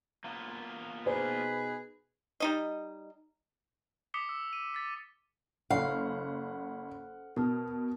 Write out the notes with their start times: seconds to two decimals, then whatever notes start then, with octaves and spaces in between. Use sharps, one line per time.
0.24 A#3 B3 F4
1.06 B2 D#4 G#4 B4 C5
2.40 G3 D#4 D#5
4.14 D6 D#6 B6 C#7 G7
4.29 E6
4.53 D#7
4.74 A6 B6
5.70 F#1 A4 C5 F5 F#5 F6
7.36 B2 A#4 A5 F6